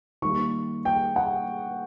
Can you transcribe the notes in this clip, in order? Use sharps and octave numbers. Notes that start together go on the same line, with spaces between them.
D#3 G3 A#3 C#6
G5
F#5